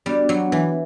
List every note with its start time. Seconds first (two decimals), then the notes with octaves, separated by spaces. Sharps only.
0.06 G3 B3 D4 F#4
0.29 F#3
0.52 E3